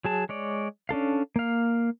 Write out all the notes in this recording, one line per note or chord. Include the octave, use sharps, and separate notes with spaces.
F#3 G#4 A5
G#3 C#5 D5
C#4 D4 A4 F5
A#3 F5